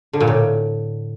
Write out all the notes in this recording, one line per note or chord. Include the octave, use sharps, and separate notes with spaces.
D3
A#2
A2